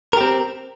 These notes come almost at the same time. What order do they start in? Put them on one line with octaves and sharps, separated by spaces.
A#4 G4 C4